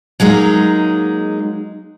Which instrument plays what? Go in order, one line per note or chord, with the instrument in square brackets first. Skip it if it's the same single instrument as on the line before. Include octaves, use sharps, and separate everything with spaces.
[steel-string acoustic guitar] F#3 G#3 A#3 D#4